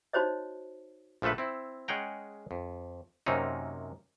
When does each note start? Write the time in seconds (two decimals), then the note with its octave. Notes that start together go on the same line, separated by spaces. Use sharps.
0.13 D#4 F#4 C5 C#5 D#5
1.22 A#1 F3 A3 A4 B4
1.38 C4 E4
1.88 G#3 C#4 G#4 F#5 G5 A#5
2.51 F2
3.26 F#2 C3 A#3 C4 C#4 D#4